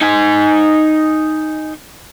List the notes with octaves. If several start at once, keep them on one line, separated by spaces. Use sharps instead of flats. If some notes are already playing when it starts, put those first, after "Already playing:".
D#4 G#5